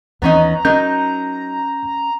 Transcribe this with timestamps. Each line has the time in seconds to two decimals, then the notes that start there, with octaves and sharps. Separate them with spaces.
0.22 D#2 E3 B3 C#4 D#4 A#5
0.65 F#3 C#4 D#4 A#4 G6